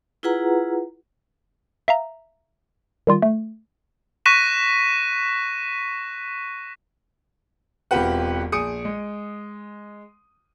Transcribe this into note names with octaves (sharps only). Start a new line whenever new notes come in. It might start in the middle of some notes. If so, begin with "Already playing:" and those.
E4 F4 G#4 B4 F#5 A#5
E5 F5 A#5
D#3 G3 F4
A3
C#6 F#6 A#6 B6 D#7 E7
E1 C4 F4 G4 B4 F#5
A#1 G#4 D#6 C#7 D7
G#3